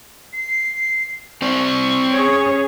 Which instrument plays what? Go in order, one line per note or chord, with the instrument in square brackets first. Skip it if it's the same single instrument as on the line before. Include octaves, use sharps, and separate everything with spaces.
[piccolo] C7
[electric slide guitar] C4 C5 D5 [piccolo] C#6
[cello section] C#4 G#4 C#5